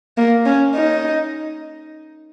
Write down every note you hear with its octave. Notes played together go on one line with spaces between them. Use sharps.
A#3
C#4
D#4